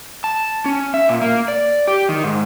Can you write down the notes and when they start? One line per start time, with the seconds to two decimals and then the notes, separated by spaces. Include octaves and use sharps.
0.24 A5
0.66 C#4
0.94 E5
1.09 A#2
1.21 A#3
1.48 D5
1.87 G4
2.09 D#3
2.24 G#2